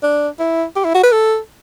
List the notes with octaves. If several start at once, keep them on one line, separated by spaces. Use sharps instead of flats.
D4
E4
G4
E4
F#4
B4
A4